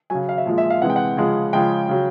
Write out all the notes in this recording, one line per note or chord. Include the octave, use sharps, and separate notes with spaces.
C#3 F#3 G#5
F5
E5
A#2 F3 G#3
E5
F5
C3 E3 G#3 F#5
G5
F#5
C#3 F3 G#3
C#3 F3 G#3 G5
C#3 F#3